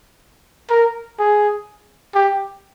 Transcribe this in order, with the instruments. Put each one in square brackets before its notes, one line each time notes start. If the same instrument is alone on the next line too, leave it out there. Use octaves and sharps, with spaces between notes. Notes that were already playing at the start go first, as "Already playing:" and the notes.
[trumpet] A#4
G#4
G4